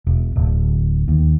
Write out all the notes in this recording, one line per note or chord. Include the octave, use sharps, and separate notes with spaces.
E1
D1
D#2